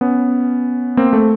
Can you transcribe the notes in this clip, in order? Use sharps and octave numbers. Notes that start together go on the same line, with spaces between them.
B3 C#4
A#3 C4
A3